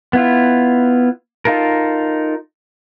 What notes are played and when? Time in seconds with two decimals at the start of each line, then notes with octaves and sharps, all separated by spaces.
0.13 B3 E4 F4
1.45 D#4 F4 A4 A#4